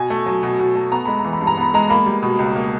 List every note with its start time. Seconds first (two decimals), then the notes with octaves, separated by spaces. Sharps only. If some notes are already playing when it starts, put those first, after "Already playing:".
Already playing: B2 G#5
0.10 A3
0.26 F#3
0.43 B2
0.59 B2
0.75 A3
0.92 B3 A#5
1.06 G#3 B5
1.19 A#5
1.24 E3
1.33 B5
1.41 G2
1.47 A#5
1.57 B3 B5
1.74 G#3 A#5
1.90 A#3 B5
2.06 G3
2.23 B2
2.39 C#2
2.56 A#3